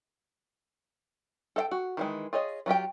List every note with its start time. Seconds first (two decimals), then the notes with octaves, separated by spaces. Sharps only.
1.56 A4 F5 G5
1.71 F#4
1.97 D#3 E3 G#3
2.33 F4 G#4 C#5 D#5
2.66 F#3 F4 G4 G5